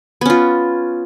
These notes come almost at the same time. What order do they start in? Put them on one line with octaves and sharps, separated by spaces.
B3 C#4 F4